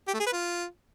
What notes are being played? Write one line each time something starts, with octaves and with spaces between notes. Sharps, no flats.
G4
A3
G#4
B4
F4